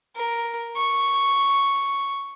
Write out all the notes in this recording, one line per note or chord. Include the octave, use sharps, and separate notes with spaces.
A#4
C#6